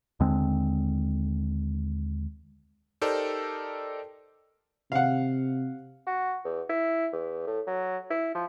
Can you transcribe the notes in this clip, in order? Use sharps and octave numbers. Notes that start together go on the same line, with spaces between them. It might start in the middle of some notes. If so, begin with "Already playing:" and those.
D#2 D3 G#3 C4
D#4 G4 A4 A#4 C5 D5
C3 F5 F#5
F#4
E2
E4
E2
A2
F#3
E4
F3